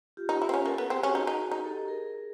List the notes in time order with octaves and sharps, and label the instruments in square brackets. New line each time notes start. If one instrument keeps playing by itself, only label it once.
[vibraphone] F4 G4
[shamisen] D#4
E4
C4
C#4
[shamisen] A#3 [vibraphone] A4
[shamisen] B3 [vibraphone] G#4
[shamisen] C4 [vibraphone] G4
[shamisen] C#4 [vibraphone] F#4 G#4
[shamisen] D#4
D#4
D#4
[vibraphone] G4 A4
G#4 A#4